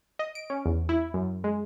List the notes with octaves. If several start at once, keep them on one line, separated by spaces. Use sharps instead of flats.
D#5
D7
C#4
E2
E4
F#2
G#3